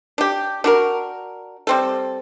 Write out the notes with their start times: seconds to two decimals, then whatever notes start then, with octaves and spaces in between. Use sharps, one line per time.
0.18 D4 G4
0.64 D4 F#4 A#4
1.67 G3 C4 A4